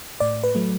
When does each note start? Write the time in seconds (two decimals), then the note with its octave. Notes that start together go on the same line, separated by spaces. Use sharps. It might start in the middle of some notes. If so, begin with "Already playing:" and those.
0.20 A2 D5
0.44 B4
0.55 F#3 A3